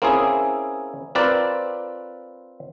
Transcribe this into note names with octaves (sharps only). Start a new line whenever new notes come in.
A#3 C4 C#4 E4 G#4
C4 F4 A#4 B4 D5